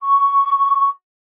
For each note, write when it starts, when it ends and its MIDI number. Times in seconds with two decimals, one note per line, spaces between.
0.01 0.89 85